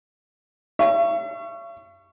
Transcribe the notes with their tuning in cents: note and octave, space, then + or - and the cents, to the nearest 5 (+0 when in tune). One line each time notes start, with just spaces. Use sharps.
E5 +45 C#6 +0